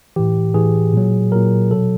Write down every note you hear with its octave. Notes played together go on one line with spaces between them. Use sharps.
A2 E3 G4
A2 E3 G#4
A#2 F#3
A#2 F#3 A#4
B2 F#3 A4